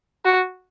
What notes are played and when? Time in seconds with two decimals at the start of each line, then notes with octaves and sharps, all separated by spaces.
0.25 F#4